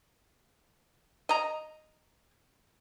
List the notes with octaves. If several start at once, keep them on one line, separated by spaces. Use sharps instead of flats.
D#5 A#5